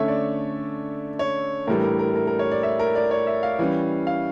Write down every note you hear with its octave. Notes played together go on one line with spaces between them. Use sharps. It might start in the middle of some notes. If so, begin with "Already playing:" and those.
Already playing: D3 A3 C#4 C#5 E5
D5
C#5
A2 E3 G3 D4 A#4
A#4
A#4
A#4
A#4
C#5
D5
E5
A#4
D5
C#5
E5
F5
E3 G3 C#4
F5